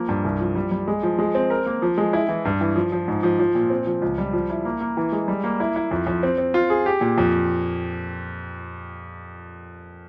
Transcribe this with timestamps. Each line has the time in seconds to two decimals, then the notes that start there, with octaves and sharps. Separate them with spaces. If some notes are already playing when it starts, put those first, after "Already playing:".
Already playing: F3 A#3
0.09 G2
0.25 C2
0.40 F3
0.55 G3
0.71 G3
0.88 G#3
1.03 F3
1.19 G#3
1.35 C4
1.50 A#4
1.66 A#3
1.82 F3
1.98 G#3
2.13 E4
2.29 E3
2.45 G2
2.61 E3
2.76 F3
2.92 F3
3.08 G#2
3.23 F3
3.39 F3
3.55 A#2
3.70 C4
3.86 F3
4.02 C#2
4.18 G3
4.33 F3
4.50 E4
4.65 A#3
4.81 A#3
4.97 E3
5.12 G#3
5.28 G3
5.44 A#3
5.60 E4
5.76 E4
5.91 F2
6.07 F2
6.23 C4
6.38 C4
6.54 F4
6.70 G#4
6.86 G4
7.01 A#2
7.18 F2